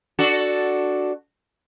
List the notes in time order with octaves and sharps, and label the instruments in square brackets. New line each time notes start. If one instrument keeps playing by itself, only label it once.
[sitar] D4 F#4 A4